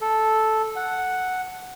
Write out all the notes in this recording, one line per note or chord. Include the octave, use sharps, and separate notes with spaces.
A4
F#5